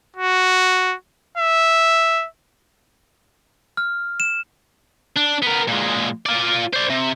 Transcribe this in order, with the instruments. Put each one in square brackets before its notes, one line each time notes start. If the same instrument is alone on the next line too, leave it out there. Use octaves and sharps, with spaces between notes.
[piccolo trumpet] F#4
E5
[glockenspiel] F6
E7
[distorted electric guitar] D4
B3 A#4
A#2 G#3
F4 D5
C5 D5
C3